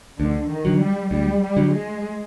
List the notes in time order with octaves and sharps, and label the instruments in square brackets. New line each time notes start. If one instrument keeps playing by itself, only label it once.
[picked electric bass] D2 [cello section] D3
[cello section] D#3
[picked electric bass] D3 F#3
[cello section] G3
[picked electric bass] D2 [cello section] G3
[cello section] G3
[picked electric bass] D3 F#3
[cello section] G#3